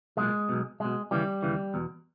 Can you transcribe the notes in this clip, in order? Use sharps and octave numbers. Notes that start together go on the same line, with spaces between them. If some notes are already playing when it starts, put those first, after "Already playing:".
B1 A#2 G#3
B1 B2
B1 B2 G#3
D#2 C#3 E3 G3
D#2 C#3 E3
E2 B2